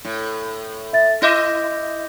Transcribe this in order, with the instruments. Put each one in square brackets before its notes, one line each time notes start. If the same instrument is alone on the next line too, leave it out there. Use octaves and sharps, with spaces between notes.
[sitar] A2
[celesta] E5 A6
[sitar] E4 D#5 E5 [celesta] D6 G6 A#6